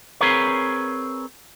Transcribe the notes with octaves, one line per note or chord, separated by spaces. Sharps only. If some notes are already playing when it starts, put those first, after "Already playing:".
C4 G#4 A#4 B4 C#5